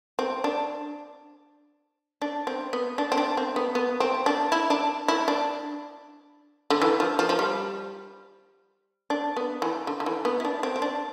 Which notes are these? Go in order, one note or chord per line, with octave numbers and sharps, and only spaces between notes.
C4
D4
D4
C4
B3
D4
C4
D4
C4
B3
B3
C4
D4
E4
D4
E4
D4
D3
E3
F3
F3
F3
G3
D4
B3
E3
D3
D3
E3
B3
E4
D4
C4
C4
D4